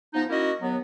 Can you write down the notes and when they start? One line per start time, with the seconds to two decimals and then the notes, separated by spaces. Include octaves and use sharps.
0.14 F3 B3 D#4
0.29 A#3 C#4 E4 F#4 D#5
0.61 D#2 F#3 B3